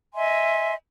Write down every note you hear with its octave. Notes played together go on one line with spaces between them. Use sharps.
D#5 E5 G#5 C6